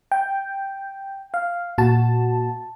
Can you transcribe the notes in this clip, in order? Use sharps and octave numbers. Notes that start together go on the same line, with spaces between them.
G5
F5
A#2 F#4 A5